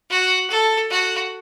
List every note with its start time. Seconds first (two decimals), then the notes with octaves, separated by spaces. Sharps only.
0.10 F#4
0.50 A4
0.90 F#4